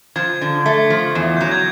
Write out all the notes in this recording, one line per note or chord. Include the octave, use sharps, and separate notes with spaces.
F3 G#6
D3
A3
F3
E2
F#3 G6
G#6